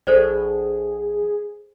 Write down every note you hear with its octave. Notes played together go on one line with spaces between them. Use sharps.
A#1 G#4 A4 C5 D5